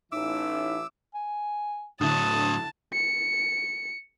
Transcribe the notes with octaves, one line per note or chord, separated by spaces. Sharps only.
A1 E3 C#4 D#4 E5 D6 E6
G#5
A2 D3 F#3 E4 A5 D#6
C#7